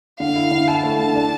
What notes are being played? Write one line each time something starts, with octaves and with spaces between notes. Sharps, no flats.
D3 F5
E4
D3
E4 A5
A3
D3
D4